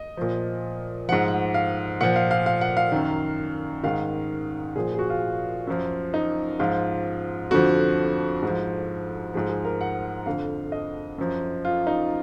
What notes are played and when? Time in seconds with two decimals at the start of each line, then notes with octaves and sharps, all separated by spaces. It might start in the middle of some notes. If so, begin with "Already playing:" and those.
Already playing: D#5
0.17 A#2 F3
1.09 G#2 F3 F#5
1.28 F#5
1.54 F5
2.01 A#2 F3 F#5
2.16 F5
2.31 F5
2.46 F5
2.61 F#5
2.77 F5
2.92 F#2 D#3
3.83 G#2 D#3 F5
4.76 A#2 F3 G#4
4.94 G#4
4.99 F#4
5.10 F4
5.67 F#2 F3
6.14 D#4
6.59 G#2 F3 F4
7.51 F2 D3 F3 F#4
8.43 G#2 F3
9.34 G#2 F3 G#4
9.49 G#4
9.65 A#4
9.81 F#5
10.26 F2 D3 F3 F5
10.72 D#5
11.18 F#2 F3
11.65 F4
11.87 D#4